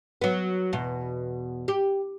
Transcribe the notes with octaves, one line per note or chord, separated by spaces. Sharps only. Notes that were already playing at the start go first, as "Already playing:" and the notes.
F#3 B3
E2 B2
G4